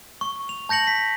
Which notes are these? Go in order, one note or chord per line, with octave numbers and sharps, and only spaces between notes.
C#6
F7
A5 G6 A#6 C#7 F#7
B6